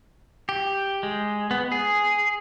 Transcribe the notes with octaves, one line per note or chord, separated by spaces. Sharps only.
G4
G#3
B3
G#4